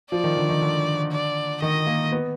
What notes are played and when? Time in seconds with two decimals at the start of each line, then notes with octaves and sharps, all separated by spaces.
0.11 F3 D5
0.24 D#3
0.37 D3
0.49 D#3
0.61 D3
1.12 D5
1.62 D#3 D#5
1.87 A#3
2.12 B3